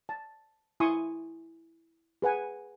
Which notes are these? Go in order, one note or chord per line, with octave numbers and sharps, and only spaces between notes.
A5
E4 G#5 C6 C#6 D#6
G#4 B4 F#5 G#5